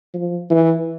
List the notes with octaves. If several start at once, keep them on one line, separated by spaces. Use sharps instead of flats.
F3
E3